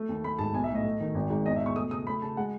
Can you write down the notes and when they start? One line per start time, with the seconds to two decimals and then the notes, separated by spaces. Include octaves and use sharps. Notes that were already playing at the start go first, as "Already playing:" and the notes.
Already playing: A3
0.09 D#2
0.24 A3 B5
0.38 G#2 A5
0.54 B1 G#5
0.64 E5
0.70 A2 D#5
0.84 A3
1.01 D#3
1.15 G#1
1.30 G#2
1.45 E2 D#5
1.56 E5
1.61 B2
1.66 C#6
1.75 A3 D#6
1.91 C#3 D#6
2.07 A3 B5
2.22 C#3 A5
2.37 G#3 F#5